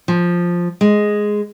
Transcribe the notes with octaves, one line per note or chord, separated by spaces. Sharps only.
F3
G#3